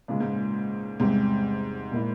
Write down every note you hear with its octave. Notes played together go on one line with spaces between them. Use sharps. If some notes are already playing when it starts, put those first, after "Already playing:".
C#2 A#2 C#3 F3 G#3
G#2
A#2
E2 G#2 C3 G3 C4 G4
A#2 F3 A#3 E4